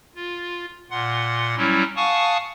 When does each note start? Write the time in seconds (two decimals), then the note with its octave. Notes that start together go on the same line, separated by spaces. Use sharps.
0.15 F4
0.90 A#2 F#5 C6
1.57 F#3 G3 C#4 E4
1.96 F5 F#5 G#5 A5 C#6 D#6